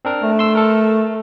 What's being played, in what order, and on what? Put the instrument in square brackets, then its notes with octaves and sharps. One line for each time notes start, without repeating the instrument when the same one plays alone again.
[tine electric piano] C4 D4 A#4
[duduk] A3
[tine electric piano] C6 E6
A4 A#4